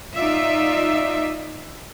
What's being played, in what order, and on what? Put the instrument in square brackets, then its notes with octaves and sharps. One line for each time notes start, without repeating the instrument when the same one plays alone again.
[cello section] D#4 F4 D5 E5